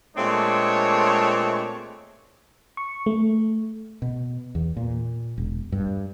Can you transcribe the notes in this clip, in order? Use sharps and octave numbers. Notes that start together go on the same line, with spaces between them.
A#2 G#3 A3 C4 D4 C#5
C#6
A3
B2
E2
A#2
E1
G2